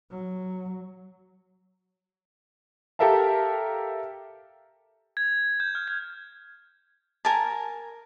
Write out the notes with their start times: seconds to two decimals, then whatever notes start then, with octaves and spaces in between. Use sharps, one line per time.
0.11 F#3
2.99 G4 A4 A#4 E5 F5 A5
5.17 G#6
5.60 G6
5.75 F6
5.88 G#6
7.25 A#4 G#5 A5